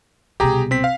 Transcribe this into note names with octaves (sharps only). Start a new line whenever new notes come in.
C2 B2 G4 G#4 A#5
C4 B6
F5